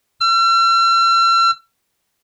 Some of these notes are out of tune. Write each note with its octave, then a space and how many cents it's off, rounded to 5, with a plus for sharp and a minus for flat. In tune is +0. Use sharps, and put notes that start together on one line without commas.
E6 +45